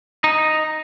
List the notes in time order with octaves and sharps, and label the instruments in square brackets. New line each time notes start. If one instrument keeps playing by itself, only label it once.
[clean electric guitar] D#4